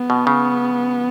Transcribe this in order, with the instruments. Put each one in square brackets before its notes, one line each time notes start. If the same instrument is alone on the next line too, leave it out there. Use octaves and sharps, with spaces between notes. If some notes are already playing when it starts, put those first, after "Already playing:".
Already playing: [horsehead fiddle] B3
[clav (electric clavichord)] B2
C#3